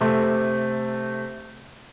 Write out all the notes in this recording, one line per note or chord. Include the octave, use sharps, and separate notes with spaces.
C3 A3